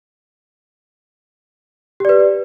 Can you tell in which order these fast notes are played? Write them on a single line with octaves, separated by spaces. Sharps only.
G4 D5 B4